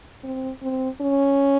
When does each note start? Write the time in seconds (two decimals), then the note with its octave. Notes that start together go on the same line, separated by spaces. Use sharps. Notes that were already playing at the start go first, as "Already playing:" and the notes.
0.24 C4
0.62 C4
1.01 C#4